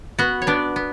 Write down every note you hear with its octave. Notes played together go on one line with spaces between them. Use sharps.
B3 F#4 F#5
C#5
B3 D4 D5
B3